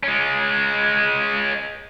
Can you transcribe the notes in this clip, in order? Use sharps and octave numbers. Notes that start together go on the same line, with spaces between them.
G#3 C#4